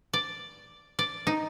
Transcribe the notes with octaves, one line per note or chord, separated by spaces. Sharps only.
D5
D5
D#4